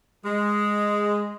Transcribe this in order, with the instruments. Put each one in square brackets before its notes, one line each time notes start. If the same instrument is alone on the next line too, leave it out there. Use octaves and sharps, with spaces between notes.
[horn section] G#3